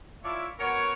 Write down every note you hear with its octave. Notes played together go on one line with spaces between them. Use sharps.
E4 F4 C#5 D5 E5
B3 F#4 A#4 C#5